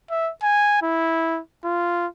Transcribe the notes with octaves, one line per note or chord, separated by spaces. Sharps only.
E5
G#5
E4
F4